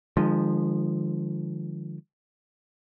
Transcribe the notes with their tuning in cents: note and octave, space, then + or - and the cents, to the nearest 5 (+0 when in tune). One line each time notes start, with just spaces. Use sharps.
D3 +45 F3 +0 G#3 -20